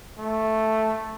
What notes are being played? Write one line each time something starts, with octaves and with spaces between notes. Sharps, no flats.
A3